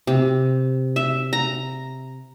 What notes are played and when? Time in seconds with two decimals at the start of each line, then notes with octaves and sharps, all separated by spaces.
0.07 C3
0.96 E5
1.33 A#5